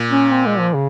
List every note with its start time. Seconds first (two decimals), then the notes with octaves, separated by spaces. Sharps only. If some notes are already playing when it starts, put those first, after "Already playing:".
Already playing: A#2
0.11 C#4
0.32 C4
0.46 G#3
0.59 F3
0.74 C#3